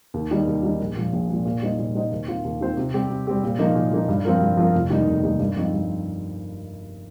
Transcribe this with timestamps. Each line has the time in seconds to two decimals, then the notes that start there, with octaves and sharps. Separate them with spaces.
0.14 D#2
0.31 D#3 G3 D#4
0.47 D#2
0.63 D#3 G3 D#4
0.80 A#1
0.96 A#2 F3
1.13 A#1
1.30 A#2 F3
1.45 A#2
1.62 G3 D#4 C5 D#5
1.79 A#2
1.94 G3 D#4 C5 D#5
2.12 D#2
2.28 D#3 C4 F4 C5
2.44 D#2
2.61 D#3 C4 F4 C5
2.77 C3
2.94 G3 C4 G4
3.10 C3
3.27 G3 C4 G4
3.43 A#2
3.59 F3 A#3 D#4
3.75 A#2
3.92 F3 A#3 D#4
4.08 G2
4.25 F3 C4 F4 A#4
4.42 G2
4.57 F3 C4 F4 A#4
4.75 F1
4.90 D#2 D#3 G3 D#4
5.07 F1
5.23 D#2 D#3 G3 D#4
5.39 G2
5.57 F3 C4 D#4
5.73 G2